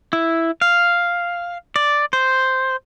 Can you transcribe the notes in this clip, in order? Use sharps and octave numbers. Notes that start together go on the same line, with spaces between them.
E4
F5
D5
C5